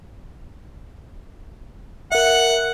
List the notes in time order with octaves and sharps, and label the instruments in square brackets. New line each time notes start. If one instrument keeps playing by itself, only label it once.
[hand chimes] A#4 E5 [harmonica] F#5